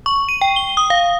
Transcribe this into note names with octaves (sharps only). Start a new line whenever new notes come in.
C#6
D#7
G5
G7
D#6
F5